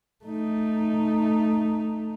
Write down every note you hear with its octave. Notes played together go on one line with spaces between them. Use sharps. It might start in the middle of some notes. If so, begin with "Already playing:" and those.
A3 D#4